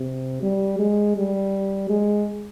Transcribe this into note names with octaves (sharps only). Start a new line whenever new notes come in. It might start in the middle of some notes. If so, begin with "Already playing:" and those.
Already playing: C3
G3
G#3
G3
G#3